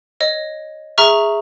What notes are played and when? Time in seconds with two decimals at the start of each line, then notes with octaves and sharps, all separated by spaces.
0.21 C#5 D#5
0.98 G#4 E5 A#5 C#6 F6